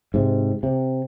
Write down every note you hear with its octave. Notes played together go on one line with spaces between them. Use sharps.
G#2 C3
C3